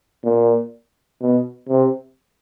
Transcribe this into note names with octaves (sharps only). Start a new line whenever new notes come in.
A#2
B2
C3